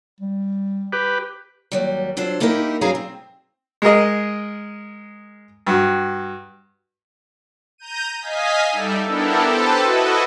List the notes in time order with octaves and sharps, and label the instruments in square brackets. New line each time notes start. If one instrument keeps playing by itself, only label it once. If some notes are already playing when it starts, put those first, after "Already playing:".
[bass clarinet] G3
[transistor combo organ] G4 B4
[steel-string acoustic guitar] D#2 F#3 G3
F#3 D4 F4 A4 C5
A#3 D#4 E4 G4 A#4
G2 F#3 C#4 G#4 F5 A#5
C4
[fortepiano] G#3 G#4 A#4 D#5
G2 F#4
[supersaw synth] A#5 G6 D#7
D#5 F5 G#5 B6
G3 D#4 A4 D5 E5
B3 D4 E4 G4 A4 A#4
G4 A4 B4 C5 A5
E4 F#4 A4 B4 D#5